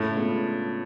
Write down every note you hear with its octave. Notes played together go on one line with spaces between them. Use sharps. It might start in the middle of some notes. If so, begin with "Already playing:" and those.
Already playing: A2 C#3
G#3 B3 D4 F4